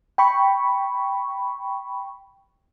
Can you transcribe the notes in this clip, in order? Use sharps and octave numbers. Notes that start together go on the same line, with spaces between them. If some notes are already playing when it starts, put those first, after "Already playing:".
G5 B5 C#6